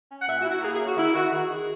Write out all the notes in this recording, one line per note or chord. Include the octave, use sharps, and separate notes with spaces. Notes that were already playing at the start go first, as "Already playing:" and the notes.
C#4
F#5
A#2 E5
F#4
E4
F#4
A#3 G#4
G#4
C#4
F#4
D#3 E4
D#3 F#4
D#3 G#4
D#3